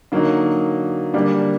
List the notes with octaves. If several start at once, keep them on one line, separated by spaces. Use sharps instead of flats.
D3 F#3 A#3 D#4
D3 G3 A#3 D4